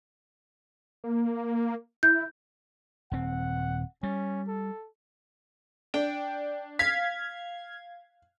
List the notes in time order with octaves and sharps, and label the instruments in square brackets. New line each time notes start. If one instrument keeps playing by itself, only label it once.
[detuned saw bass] A#3
[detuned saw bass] E4 [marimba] G6
[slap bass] D#1 C4 [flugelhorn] F#5
[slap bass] G3 [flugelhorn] C#4
[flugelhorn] A4
[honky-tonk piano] D4 [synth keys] G5
[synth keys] F5 G#6 [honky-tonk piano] B6